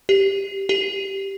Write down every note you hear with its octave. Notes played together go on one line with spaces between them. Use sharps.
G4
G4